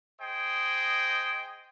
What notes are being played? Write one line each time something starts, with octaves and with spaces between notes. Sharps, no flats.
G#4 C5 D#5 G5